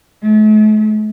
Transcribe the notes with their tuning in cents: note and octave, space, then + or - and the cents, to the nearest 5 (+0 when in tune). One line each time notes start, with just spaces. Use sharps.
A3 -45